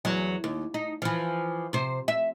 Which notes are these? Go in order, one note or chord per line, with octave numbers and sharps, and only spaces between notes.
E2 F#3
D#2
D#4
E3 F3
C3 C5
E5